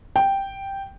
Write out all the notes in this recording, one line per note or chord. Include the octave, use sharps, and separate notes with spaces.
G5